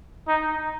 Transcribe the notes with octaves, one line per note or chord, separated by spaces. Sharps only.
D#4